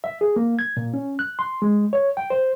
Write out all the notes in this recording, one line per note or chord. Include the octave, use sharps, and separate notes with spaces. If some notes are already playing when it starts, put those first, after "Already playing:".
E5
G#4
A#3
G#6
A#2
C#4
F#6
C6
G#3
C#5
G5
C5